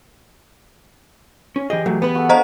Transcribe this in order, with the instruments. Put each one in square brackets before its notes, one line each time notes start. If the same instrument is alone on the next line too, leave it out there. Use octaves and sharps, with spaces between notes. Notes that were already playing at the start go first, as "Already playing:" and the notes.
[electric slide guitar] C#4
[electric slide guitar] E3 G4 G#4 [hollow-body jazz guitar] D#5
[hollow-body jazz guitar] F#3 A3
B3 B4
[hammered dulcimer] F#4 A4
[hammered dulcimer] D4 F5 [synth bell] C5 D#5 A#5